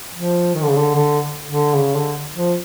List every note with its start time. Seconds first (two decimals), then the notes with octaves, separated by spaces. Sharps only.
0.14 F3
0.54 D#3
0.62 D3
0.70 C#3
0.78 D3
0.95 D3
1.48 D3
1.75 C#3
1.95 D3
2.35 F3